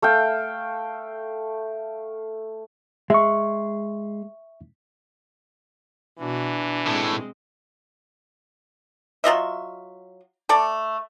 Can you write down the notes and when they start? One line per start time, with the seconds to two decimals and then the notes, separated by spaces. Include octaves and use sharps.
0.02 A3 F5 G5
3.10 G#3 E5 C#6
6.19 B2 E3 D4 F#4
6.87 A2 G#3 C4
9.24 F#3 F4 D#5 E5
10.49 A3 A4 D5